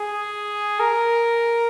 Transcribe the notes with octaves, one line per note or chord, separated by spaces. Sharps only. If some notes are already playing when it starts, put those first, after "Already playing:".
Already playing: G#4
A#4